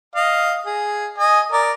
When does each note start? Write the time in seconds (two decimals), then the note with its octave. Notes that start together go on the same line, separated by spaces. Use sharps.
0.15 D#5 F5
0.66 G#4
1.18 D#5 G#5
1.52 A#4 D5